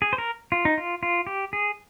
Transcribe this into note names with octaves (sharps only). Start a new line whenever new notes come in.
G#4
C5
A#4
F4
D#4
F4
F4
G4
G#4